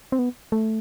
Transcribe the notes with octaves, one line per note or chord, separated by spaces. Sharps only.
C4
B3
A3